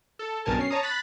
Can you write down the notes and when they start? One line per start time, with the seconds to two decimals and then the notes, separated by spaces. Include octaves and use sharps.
0.19 A4
0.45 B1 G2 B2 A#4 G#5 A5
0.59 C#4 C7
0.70 C#5 A5 A#5 D#6
0.83 B5 F#6 A6 B6